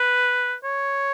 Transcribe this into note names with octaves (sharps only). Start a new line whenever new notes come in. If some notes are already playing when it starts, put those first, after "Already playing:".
Already playing: B4
C#5